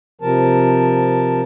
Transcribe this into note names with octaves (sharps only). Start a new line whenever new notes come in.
C3 F3 A#4 A5